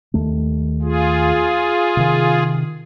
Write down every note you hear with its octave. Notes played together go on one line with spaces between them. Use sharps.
D#2 D#3 A3
F4 G#4
C3 D#3